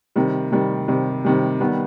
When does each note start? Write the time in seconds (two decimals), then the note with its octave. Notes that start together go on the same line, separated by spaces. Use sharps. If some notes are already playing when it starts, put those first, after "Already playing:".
0.16 C3 D#3 G3
0.52 C3 D#3 G3
0.88 C3 D#3 G3
1.25 C3 D#3 G3
1.60 D#3 G3 B3